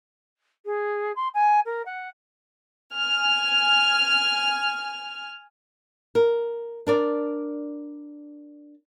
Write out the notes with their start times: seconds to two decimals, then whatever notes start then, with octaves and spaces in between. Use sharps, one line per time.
0.65 G#4
1.15 C6
1.34 G#5
1.65 A#4
1.85 F#5
2.94 G#5 F6
6.15 A#4
6.87 D4 A#4 D5